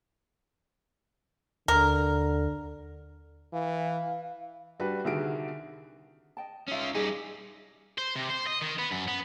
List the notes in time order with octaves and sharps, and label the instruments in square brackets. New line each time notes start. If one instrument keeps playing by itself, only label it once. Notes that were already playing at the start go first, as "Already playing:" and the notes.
[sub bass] D#2 [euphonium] D3 [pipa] A#4
[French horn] E3 [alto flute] F5
[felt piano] G3 D4 F#4 B4
C2 D3 D#3 F#4 G#4 D7
[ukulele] D#5 G5 A5
[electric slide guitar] C#4 F4 [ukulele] D#4 E5
[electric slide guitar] G3 D#4 [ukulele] G#4 D5 D#5
[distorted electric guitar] C5
C3
C5
D#5
D#3
B3
F#2
B3